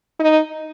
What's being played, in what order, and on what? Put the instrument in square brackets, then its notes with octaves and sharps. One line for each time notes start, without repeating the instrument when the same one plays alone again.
[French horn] D#4